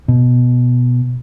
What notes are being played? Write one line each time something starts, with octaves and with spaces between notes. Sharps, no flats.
B2